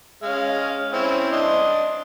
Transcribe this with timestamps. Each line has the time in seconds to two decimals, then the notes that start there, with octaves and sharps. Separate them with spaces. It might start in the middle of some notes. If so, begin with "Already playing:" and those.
0.23 G#3 C#4 F5
0.93 C4 C#4 E4
1.32 D4 D#5 C6